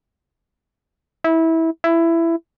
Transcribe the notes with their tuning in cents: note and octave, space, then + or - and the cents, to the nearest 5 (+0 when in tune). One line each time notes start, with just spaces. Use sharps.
E4 -20
E4 +15